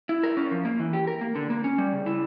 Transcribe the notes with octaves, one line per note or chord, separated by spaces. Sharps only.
E4
A#4
C#4
F3
A#3
E3
G4
A#4
A#3
D3
A#3
C#4
G3
C#3
E4